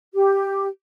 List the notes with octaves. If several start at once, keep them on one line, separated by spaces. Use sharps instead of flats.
G4